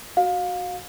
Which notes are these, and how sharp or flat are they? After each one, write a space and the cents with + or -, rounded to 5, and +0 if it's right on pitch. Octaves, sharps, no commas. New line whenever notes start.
F#4 +0 F5 +25